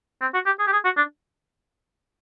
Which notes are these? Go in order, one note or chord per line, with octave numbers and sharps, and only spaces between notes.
C4
F#4
G4
G#4
G4
G#4
F#4
D4